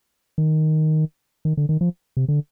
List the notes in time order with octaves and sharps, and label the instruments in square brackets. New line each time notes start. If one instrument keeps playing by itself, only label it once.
[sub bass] D#3
D#3
D3
D#3
F3
C3
D3